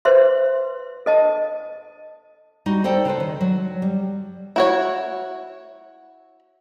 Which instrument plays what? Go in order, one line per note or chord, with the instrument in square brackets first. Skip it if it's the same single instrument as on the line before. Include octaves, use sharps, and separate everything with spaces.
[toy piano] B4 C5 E5 C6
A4 D#5 A5
[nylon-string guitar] G3 D#4 F#4
A4 C5 D5 G5
C#3 A4 B4 C5
D#3
F#3
G3
[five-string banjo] E4 F#4 C#5